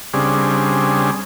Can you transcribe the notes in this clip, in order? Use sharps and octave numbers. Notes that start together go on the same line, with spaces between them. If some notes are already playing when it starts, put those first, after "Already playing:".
C#3 G3 C4 D4 G#4